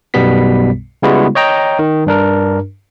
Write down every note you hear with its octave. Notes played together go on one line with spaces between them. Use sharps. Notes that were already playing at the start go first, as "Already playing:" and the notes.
B1 F#2 B2 G3 B3 B6
C#3 G3 G#3 B3 E4 F#4
C#5 D#5 G5 A#5
D#3
G2 D4 A#4